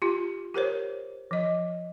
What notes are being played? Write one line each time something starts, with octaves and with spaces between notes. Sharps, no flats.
F4 G4
G4 A#4 C5 C#5
F3 D#5